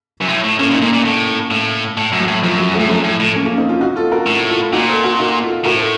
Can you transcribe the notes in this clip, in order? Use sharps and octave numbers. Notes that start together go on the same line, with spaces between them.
F#2
A2
A2
A2 A#3 C#4
A#2
D#4
A#2 A#3 C#4
A#2
A2
A2
A2
F#2
F#3
A2
F#2 F3
F#3
F3 A3
A2
F#2 F3 A3
A2
A2
A#3 C#4
A#3 C#4
C4 D#4
C#4 F4
D#4 F#4
F4 A4
F#4 A#4
A2
F4 A4
A#2 D#4 F#4
A4 C5
F#4 A#4
D#4 F#4
F4 A4
A2 F#4 A#4
A4 C5